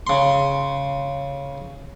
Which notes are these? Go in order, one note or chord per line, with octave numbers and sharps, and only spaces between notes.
C#3 C6